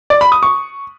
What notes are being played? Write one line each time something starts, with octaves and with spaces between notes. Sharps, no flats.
D5
B5
D#6
C#6